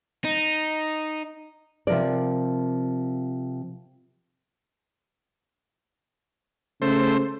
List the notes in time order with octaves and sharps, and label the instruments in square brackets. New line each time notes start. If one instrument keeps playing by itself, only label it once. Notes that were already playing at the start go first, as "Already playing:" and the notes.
[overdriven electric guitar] D#4
[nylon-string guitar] C3 F3 A#4 D5
[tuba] C#3 [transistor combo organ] A3 C5